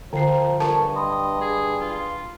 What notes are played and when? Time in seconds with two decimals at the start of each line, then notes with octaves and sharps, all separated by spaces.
0.13 D3 F3 G5 A#5 C7
0.60 G2 C#4 A4 A#4 A5
0.96 D#5 G5 B5 C6
1.41 G#4
1.81 F4